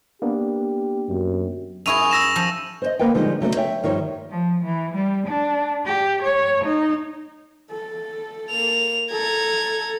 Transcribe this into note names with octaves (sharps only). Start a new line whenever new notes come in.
A#3 B3 D4 G4
F#2
F#2 E4 G#4 C#6 D#7 F7
E6 A#6 E7
F3
C5 C#5 D#5
D2 A#3 A#4 B4 F#5 G5
D3 F3 G3 G#3 D#4
C#3 F#3 A3 B3
C#5 E5 G5
G2 D#3 F3 G3 C#5
F3
E3
G3
D4
G4
C#5
D#4
A4
A#3 F7
A4 A#5 G#6